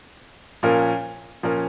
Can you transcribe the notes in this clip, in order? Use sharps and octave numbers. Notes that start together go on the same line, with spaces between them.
A#2 F3 C#4 A#4
A#2 F3 C#4 A#4